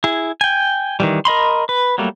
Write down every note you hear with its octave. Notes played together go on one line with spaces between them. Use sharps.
E4 G#4
G5 G#5
D#3 E3 G3
A#4 D#5 B5 C6
B4
F#3 G3 A3 A#3